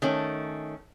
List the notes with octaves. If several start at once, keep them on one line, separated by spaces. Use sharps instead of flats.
D#3 A3 C#4